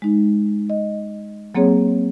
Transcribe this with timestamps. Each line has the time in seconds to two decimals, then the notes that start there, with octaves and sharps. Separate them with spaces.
0.02 G#3 D#4
0.70 D#5
1.55 F#3 A#3 C4 G#4 C#5